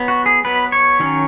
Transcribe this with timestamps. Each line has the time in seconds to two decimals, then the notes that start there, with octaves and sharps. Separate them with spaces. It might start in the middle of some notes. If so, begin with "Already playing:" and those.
Already playing: F#3 B3
0.08 F#4
0.26 G#4
0.44 F#3 B3 B4
0.72 C#5
1.00 D#3 F#3 C#4